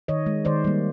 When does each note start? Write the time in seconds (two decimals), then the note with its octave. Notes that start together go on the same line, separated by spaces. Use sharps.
0.08 D#3 C#5 D#5
0.26 G#3
0.45 D#3 C5 D5
0.65 G3 A#3